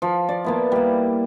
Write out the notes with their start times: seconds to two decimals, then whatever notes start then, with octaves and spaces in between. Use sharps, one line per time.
0.02 F3
0.29 D5
0.44 A#3 B3 E4
0.72 G3 A#3